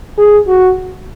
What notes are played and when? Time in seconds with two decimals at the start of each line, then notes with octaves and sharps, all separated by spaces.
0.18 G#4
0.48 F#4